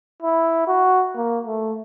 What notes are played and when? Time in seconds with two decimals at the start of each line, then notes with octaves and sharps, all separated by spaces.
0.23 E4
0.68 F#4
1.16 A#3
1.47 A3